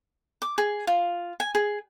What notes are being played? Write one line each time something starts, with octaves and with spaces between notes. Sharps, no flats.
D6
G#4
F4
G#5
G#4